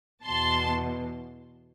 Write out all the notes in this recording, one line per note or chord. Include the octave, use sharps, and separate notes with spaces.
E2 B2 A5 C6